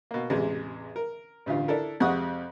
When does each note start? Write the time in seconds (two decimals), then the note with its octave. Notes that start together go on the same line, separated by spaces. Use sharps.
0.11 B2 A#3
0.30 A1 E2 C3 G#3
0.96 A#4
1.46 A1 D2 G2 F4
1.68 D4 E4 A4 A#4
2.00 F2 C3 G#3 F#5 C#6 D#6